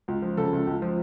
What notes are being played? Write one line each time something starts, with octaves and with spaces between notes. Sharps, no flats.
C#2
F3
C#3 A4
C#2
C#2
F3